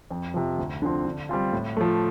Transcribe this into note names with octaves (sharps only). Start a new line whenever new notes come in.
F2
C3 F3
D2
D3 F3 C4
D3
G3 C4 F4
A2
F3 A3